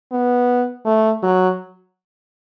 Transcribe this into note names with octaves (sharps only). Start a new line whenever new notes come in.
B3
A3
F#3